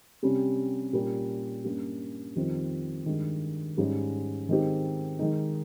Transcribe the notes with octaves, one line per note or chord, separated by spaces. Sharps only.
C3 G3 C#4
A#2 G3 C#4 G4 A#4
G2 G3 A#3 C#4
F2 D#3 G3 C4 F4
G2 D#3 G#3
G#2 G3 C#4 G#4
D#3 G#3 C4 D#4 G4
D#3 G#3 D#4